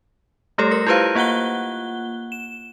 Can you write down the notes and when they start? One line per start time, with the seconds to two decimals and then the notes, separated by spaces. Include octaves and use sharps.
0.58 G3 A3 G4 A4 C#5
0.71 A#4 A#6
0.87 E4 F4 G4 B4 C5 F5
1.15 A#3 F4 F#5 F#6 G7
2.32 E7